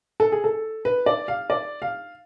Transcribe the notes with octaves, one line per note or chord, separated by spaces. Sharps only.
A4
G#4
A4
B4
D5
F5
D5
F5